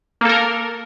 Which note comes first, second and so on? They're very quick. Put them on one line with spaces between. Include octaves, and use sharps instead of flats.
A#3 A4 A#4